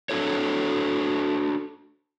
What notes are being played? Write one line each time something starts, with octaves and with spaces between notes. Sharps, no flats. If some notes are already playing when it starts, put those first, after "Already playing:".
D4 F#4 A4 C#5